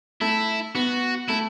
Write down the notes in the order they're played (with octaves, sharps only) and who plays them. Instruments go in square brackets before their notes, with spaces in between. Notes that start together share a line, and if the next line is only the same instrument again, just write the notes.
[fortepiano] A3 [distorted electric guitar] E4
[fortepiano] B3 [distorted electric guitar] F#4
[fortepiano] A3 [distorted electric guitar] E4